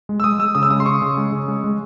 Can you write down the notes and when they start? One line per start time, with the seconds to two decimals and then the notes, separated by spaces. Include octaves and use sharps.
0.09 G#3
0.20 E6
0.24 G#3 D#6
0.39 G#3 E6
0.55 C#3 D#6
0.63 E6
0.70 G#3 D#6
0.80 C6
0.86 C#3 C#6
1.02 C#3
1.17 G#3
1.32 C#3
1.48 G#3
1.64 G#3